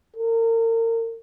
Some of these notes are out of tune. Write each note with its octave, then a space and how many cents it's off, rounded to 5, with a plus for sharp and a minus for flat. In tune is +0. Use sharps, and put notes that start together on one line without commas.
A#4 -35